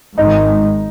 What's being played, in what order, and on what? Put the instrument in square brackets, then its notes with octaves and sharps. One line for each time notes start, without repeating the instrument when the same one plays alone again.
[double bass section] G#1 G#2 D#3 G#3 [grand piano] D#4